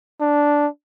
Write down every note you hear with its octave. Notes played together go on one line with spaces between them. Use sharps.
D4